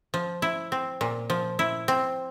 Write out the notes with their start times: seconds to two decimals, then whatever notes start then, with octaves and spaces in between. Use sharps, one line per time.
0.14 F3
0.42 E4
0.72 C4
1.01 A#2
1.30 F3
1.59 E4
1.88 C4